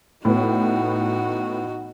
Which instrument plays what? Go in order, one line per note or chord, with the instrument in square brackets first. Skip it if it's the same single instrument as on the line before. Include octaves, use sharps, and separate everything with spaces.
[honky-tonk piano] A2 B3 [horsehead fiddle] D#4 F#4